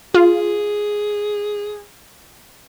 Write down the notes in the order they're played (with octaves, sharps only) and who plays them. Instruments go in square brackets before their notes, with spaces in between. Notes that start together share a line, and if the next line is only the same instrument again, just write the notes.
[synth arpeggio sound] F4 [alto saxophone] G#4